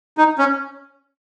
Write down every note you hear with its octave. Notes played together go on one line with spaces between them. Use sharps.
D#4
C#4